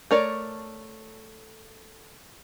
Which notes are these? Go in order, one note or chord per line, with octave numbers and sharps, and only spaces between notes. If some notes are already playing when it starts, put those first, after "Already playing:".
A3 A#4 C#5 D5